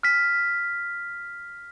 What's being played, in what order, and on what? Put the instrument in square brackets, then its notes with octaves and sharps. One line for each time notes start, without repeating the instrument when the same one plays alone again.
[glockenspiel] F6 B6